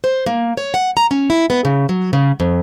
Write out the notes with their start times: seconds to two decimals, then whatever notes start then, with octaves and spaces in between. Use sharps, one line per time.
0.04 C5
0.26 A#3
0.57 C#5
0.74 F#5
0.97 A#5
1.11 C#4
1.30 E4
1.50 B3
1.65 C#3
1.89 F#3
2.13 C#3
2.40 F2